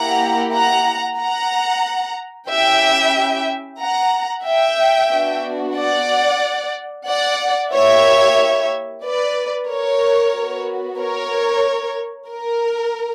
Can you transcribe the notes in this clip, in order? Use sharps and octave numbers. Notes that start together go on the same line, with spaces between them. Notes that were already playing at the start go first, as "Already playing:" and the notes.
Already playing: A#3 E4 G4 F#5 A#5
F#5 A#5
F#5 A#5
C#4 E4 G4 E5 G5
F#5 A#5
E5 G5
B3 D4 F#4
D5 F#5
D5 F#5
A#3 E4 G4 C#5 E5
B4 D5
A#4 C#5
B3 F#4
A#4 C#5
A#4